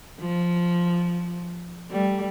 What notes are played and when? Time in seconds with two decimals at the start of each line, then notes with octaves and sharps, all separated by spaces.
0.20 F3
1.90 G3 A3